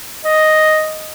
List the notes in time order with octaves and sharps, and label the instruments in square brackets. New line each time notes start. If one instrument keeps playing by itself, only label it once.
[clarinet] D#5